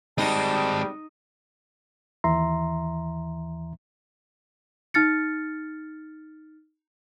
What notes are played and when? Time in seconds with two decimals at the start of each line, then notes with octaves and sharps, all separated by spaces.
0.18 G3 G#3 C4 D#4 A5
2.24 D#2 E3 E5 A#5 C6
4.94 D#4 F6 A6 C#7